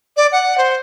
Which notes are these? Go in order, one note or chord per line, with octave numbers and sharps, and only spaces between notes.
D5
F#5
C5